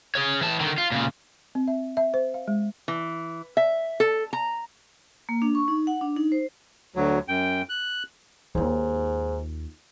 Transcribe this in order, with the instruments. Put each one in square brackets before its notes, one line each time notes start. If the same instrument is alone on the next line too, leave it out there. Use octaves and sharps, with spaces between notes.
[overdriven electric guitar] G#4 C#5
E3 A5
D3 D#3
F4
A#2 C#3
[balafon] C4
E5
E5
C5
F5
G#3
[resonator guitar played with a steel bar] E3
E5
A4
A#5
[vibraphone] A#3
D4
C#6
D#4
F#5
D4
D#4
C5
[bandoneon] D2 F#3
F#2 G5
F#6
[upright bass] D#2 F4 [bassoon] G#2